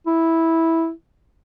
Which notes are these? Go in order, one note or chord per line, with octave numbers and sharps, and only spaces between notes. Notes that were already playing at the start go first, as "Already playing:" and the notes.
E4